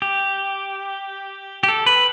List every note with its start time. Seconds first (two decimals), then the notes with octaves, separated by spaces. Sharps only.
0.02 G4
1.63 G4
1.68 A4
1.86 B4